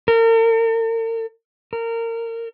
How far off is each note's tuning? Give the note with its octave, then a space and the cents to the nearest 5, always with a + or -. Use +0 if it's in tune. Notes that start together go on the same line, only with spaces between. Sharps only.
A#4 -45
A#4 -25